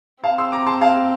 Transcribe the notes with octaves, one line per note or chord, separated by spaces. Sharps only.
C4 F5 A5
C6 E6
A#5 D6
A5 C6
F5 A5